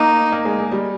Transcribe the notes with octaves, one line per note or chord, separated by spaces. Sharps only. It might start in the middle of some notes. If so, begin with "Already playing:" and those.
Already playing: A#3 D#4
A#3
G#3
G#3
G3